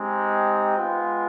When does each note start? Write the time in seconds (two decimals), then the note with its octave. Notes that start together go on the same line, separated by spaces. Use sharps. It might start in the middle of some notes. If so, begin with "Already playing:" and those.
Already playing: G#3 C4 D#4 G4
0.33 G5
0.76 G#3 B3 F4